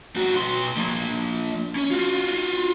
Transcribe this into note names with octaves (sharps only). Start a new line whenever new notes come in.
G2 F#4
B2 C6
F3 A#3
C#4
F4 F#4